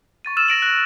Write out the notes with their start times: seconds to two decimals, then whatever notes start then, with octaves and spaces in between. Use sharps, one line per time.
0.25 C#6 A6 D#7
0.37 E6 F6 A6 E7
0.48 A#6 D7 F#7
0.62 F#6 A#6